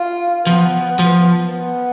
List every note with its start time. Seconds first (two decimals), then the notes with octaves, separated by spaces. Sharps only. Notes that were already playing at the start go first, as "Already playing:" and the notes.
Already playing: F4
0.46 F3 B3
0.99 F3
1.52 B3